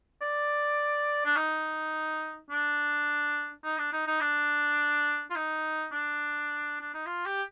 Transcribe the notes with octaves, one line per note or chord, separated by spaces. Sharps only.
D5
D4
D#4
D4
D#4
D4
D#4
D#4
D4
F4
D#4
D4
D4
D#4
F4
G4